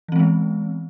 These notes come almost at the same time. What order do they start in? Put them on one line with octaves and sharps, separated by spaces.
E3 C4 G#3 B3